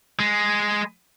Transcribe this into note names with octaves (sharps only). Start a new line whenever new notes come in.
G#3